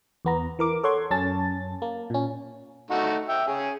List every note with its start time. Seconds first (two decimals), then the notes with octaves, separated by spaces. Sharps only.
0.25 E2 B3 A#5
0.59 E3 A#4 D6
0.83 A4 C#5 F#5 C6 G#6
1.11 F#2 C#4 A5 A6
1.82 A#3
2.10 A#2 C#4
2.90 A3 D#4 F#4
3.29 E5 G5
3.48 C#4 G#4